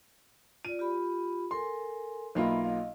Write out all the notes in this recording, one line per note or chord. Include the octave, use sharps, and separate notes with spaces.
F4 D5 D#7
F4 G4 B5
A4 A#4 G#5 C6
B1 A#3 F4 D#5 E5 B5
D#5 F5